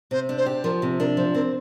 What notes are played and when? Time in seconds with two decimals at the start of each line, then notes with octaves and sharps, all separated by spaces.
0.11 C3 C5
0.29 D4
0.38 C5
0.46 G4
0.64 F3 A#4
0.82 C3
0.99 D4 A#4
1.17 F3 C5
1.35 C4 A#4